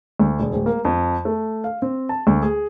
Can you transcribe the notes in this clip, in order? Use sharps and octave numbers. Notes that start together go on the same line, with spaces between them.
D2
E1
D1
A#3
F2
A3
F5
C4
A5
D2
G#4